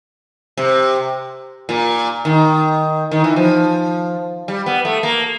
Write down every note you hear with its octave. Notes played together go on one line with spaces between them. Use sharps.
C3
A#2
D#3
D#3
E3
F3
G3
B3
A3
A#3